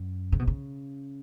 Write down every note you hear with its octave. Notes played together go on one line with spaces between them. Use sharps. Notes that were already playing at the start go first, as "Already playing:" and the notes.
Already playing: F#2
C#3
B2
C#3